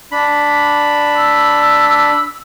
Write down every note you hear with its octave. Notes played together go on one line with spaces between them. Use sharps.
D4 B5
E6